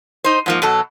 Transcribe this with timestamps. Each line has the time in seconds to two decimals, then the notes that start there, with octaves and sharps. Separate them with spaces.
0.24 D#4 C5
0.46 G#2 F3 A#3
0.62 B2 F#3 A4